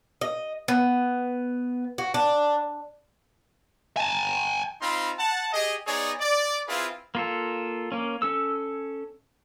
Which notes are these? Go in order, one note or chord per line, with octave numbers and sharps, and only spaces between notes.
D#5
B3
F#4
D4
G#5 A5
C4 D#4 F4 B5 C6
F#5 A5
G4 G#4 D#5
B3 D#4 G#4 C#5 D5
D5
C4 E4 F4 G#4 B4
A#3 F4 A4
A#3 C#4
C#4 A4 E6